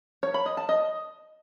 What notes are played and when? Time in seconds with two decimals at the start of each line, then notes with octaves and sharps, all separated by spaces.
0.23 C#5
0.34 B5
0.46 D#5
0.57 A5
0.69 D#5